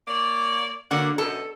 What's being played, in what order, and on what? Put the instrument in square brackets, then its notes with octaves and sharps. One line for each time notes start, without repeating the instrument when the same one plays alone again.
[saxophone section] A#3 C#5 D5
[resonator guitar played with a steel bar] D3 A#3 [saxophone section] F#3 D5 F#5
[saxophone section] F#2 B2 [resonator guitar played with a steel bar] A4